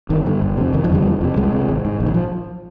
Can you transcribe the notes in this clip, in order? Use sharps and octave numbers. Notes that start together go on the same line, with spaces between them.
G1 D#3
G2 D3
G1
F2 C3
F1 D#3
F3
F2 D3 G3
F1
F2 C3
C2 G#3
C3
G#1
G#2
A#1
D#3
F3